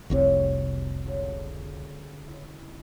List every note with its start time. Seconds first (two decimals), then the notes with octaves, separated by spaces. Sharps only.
0.10 F1 C2 C3 F#4 G4 C#5
1.06 C#2 D3
2.27 E4 D#5